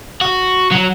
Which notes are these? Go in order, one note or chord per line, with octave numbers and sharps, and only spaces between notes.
F#4
F#3